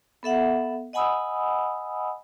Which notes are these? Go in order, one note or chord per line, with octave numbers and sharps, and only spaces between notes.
B3 A4 E5 F#5
D#5 F#5 G#5 B5 D#6 E6